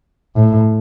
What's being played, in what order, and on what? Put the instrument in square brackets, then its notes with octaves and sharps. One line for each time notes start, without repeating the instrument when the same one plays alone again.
[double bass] A2